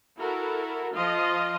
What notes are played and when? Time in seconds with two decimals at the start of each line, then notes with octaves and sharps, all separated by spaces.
0.17 E4 F#4 A4 A#4
0.94 F3 F4 D#5